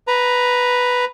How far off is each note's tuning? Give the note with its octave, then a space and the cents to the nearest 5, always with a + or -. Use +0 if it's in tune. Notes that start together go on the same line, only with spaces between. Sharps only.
B4 +0 A#5 +10